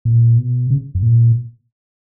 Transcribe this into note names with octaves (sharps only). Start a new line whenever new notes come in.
A#2
B2
C#3
F#2
A#2